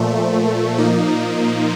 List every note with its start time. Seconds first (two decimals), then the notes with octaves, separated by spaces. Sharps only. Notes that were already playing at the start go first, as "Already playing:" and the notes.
Already playing: A#2 F3 A3
0.76 A#2 F3 A#3 D#4